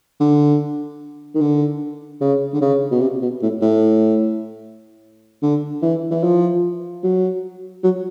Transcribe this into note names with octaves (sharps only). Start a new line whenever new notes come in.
D3
D#3
D3
C#3
D3
C#3
B2
C3
B2
A2
A2
D3
E3
E3
F3
F#3
F#3